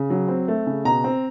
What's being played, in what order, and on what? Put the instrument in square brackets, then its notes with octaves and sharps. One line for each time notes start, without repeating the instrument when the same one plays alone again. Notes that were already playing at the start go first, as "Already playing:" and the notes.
Already playing: [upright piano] C#3
F#3
C4
A3
C#3
B2 A#5
C4